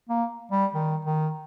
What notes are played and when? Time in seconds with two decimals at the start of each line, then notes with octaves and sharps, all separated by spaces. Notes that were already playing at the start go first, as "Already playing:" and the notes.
0.09 A#3
0.51 G3
0.74 D#3
1.05 D#3